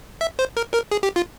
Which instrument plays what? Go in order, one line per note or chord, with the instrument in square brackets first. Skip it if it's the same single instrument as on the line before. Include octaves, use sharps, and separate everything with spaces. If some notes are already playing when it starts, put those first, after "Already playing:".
[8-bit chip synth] E5
C5
A#4
A#4
G#4
G4
F4